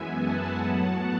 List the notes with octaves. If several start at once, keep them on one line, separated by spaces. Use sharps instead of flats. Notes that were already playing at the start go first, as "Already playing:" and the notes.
Already playing: F#2 E3 G#3 B3 E5 G#5
F#5 A5
A2 F#3 B3